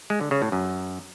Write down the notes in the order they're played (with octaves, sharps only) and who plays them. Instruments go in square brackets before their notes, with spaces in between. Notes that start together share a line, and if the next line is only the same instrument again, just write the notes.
[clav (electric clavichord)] G#3
D3
C#3
A2
F#2